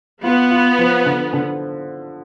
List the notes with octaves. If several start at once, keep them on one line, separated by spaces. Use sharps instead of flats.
B3 F4
F4
F3
D3
D3